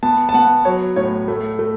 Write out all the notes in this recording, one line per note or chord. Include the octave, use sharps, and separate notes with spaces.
B3 A5
A5
B3 F#5
F#3 C#5
A2 C#5
A3
A3